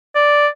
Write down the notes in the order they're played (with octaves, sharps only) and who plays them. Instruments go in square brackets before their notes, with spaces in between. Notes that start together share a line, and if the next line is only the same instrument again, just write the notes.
[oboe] D5